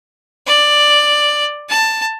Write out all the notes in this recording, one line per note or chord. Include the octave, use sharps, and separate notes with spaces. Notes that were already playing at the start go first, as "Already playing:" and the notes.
D5
A5